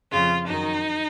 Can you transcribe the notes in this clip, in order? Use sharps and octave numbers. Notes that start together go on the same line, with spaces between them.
F2 C#3 F4
F#2 D#3 D#4